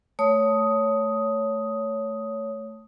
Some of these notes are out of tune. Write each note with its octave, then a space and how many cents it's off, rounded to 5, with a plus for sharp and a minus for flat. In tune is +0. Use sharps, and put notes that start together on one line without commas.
A3 +0 C#5 +15 D#6 +5